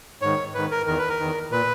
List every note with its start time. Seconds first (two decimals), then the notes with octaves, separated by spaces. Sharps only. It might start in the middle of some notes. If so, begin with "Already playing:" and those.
0.22 G#2 D#3 C#5
0.54 G#2 D#3 B4
0.71 A#4
0.86 E2 D#3 A#4
0.98 B4
1.09 A#4
1.19 E2 D#3
1.51 A#2 B4